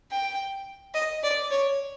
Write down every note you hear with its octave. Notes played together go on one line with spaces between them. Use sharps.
G5
D#5
D5
C#5